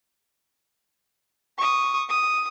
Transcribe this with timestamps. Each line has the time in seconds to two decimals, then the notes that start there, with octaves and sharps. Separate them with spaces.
1.58 C#6 D#6
2.09 D#6